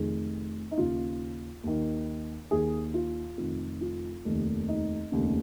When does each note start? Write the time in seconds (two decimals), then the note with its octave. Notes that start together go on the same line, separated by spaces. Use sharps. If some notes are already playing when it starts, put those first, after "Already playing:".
Already playing: F1 F2 D#3 G#4
0.71 D#4
0.78 D#2 C#3 F4
1.64 D#2 D#3
2.51 D#2 D#3 G#4
2.94 F4
3.38 F1 F2 D#3
3.81 F4
4.25 F1 D#2 D#3
4.68 D#4
5.12 F1 D#2 C#3